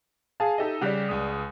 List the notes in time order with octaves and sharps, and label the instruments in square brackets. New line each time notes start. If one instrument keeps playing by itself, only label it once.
[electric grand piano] G#4 F5 [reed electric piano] G#5 A5
[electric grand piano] D#4 A4 D#5 [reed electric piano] G4 E5
[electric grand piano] C#3 G3 G4 [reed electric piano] D5 F#5
[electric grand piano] C#2 G#3 D#6